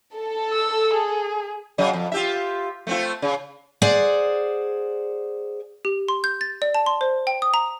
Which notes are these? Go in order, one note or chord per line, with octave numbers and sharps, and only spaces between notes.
A4
E6
G#4
C#3 F#3 D#5
F2
F4 G4 E5
A3 C4 F4
C#3
G#4 C5 D5 F#5
G4
C6
G6
A6
D5
A5
C6
C5
G5
D#6
A#5